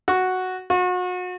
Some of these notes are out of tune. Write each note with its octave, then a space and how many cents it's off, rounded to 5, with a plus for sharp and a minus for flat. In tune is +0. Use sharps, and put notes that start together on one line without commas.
F#4 +0
F#4 -35